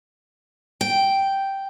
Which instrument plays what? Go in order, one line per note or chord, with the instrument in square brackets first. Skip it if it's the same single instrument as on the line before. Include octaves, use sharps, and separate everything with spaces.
[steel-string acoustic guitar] G5